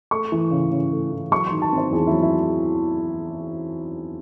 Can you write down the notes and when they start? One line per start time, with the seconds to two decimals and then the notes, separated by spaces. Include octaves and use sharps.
0.11 A3 C#6
0.32 E3
0.51 C#3
0.71 C#3
0.92 A3
1.12 E3
1.31 F#3 C#6
1.47 D#3 C6
1.62 A5
1.73 C4
1.78 C5
1.92 E2 G#4
2.07 F#3 E4
2.23 E4